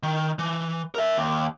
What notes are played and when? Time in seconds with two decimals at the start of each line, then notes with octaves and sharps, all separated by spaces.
0.03 D#3
0.39 E3
0.95 A#4 E5
1.16 D#2